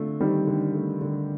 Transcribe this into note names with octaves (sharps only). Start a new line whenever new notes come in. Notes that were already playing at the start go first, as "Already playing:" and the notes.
Already playing: D3 A3 C4 F4
D#3 G3 C4
D3
A3
D3